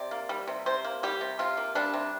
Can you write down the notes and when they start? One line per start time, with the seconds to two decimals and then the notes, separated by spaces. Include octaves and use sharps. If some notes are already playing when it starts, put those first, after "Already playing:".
Already playing: C3 D5
0.11 A#3
0.29 G3
0.47 C3
0.66 C3 C5
0.84 A#3
1.03 G3 G4
1.21 C3
1.39 C3 F4
1.57 A#3
1.75 G3 D4
1.94 C3